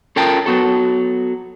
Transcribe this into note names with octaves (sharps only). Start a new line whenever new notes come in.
C#4 F4 A4 A#4 G5 A5
F#3 B3 F#4 A4